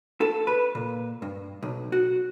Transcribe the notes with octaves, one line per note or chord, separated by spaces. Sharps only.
A4
B4
A#2
G2
B1
F#4